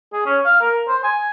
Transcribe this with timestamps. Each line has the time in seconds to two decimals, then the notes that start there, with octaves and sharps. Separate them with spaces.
0.13 G#4
0.26 C#4
0.45 F5
0.61 A#4
0.88 C5
1.04 G#5